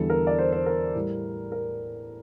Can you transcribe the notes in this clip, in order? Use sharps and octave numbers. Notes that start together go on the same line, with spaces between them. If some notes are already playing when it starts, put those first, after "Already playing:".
Already playing: E2 D3 G3 A4
A#4
D5
C5
C5
A#4
A2 G3
A#4